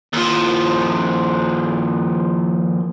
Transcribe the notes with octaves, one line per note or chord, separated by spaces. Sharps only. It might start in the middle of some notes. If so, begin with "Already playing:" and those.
D#2 F3